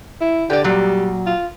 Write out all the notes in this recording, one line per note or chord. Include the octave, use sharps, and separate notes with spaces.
E4
D3 G4 D5
A#2 F#3 G3
F4